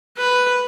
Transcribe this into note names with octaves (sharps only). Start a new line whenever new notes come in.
B4